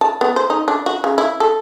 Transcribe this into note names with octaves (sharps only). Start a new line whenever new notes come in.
A5
B3
C5
D#4
D4
F#4
C#3
E4
A4